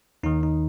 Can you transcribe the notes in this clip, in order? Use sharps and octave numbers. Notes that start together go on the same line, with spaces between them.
D#2 D#3 D#4
D#4